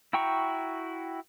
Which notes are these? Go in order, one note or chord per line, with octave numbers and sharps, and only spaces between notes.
E4 F#4 G5 A#5 C#6